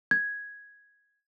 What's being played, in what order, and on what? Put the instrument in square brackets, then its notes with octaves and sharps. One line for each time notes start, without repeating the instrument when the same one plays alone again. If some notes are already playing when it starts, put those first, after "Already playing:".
[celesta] G#6